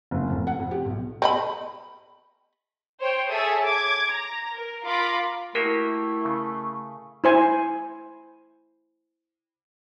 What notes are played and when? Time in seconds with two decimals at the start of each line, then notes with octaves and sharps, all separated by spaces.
0.11 F#1
0.30 F1
0.47 F#5
0.60 F2
0.71 G4
0.86 B1
1.22 C4 D#5 B5
3.00 C5 C#5 G5
3.30 G#4 A4 C#5 E5 D#6
3.64 D6 G#6
4.09 A#5
4.52 A#4
4.83 F4 A#4 B5 D6
5.55 A3 A#3 E4 F#4 G4 A#4
6.25 C#3
7.24 E4 C5 G#5